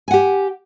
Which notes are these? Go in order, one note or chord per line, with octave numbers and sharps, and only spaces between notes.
G4 F#5 G#5